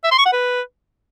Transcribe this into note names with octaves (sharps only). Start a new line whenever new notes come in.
E5
C6
C#6
F#5
B4